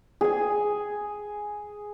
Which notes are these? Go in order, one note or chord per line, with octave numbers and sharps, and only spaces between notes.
G#4 G#5